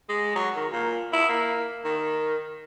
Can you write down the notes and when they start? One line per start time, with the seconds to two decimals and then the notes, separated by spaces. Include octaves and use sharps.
0.09 G#3
0.35 F#3
0.56 D#3
0.72 A#2
1.13 E4
1.29 A#3
1.85 D#3